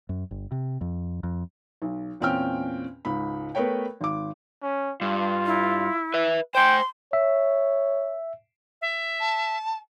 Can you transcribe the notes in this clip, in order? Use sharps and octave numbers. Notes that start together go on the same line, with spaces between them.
F#2
G1
C3
F2
F2
B1
E2 A#2 C4 C#4 G5 F6
C#2 G#2 B5
A3 B3 A#4 B4 C#5 G5
G#1 D6
C#4
G2 F4
E4
B4 E5
C5 G5 G#5 C6
C#5 E5
E5
A5